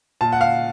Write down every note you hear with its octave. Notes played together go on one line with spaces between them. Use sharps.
A#2 A5
F#5
F5